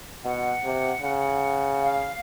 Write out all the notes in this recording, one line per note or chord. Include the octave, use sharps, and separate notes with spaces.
B2 F#5
C3
C#3
F5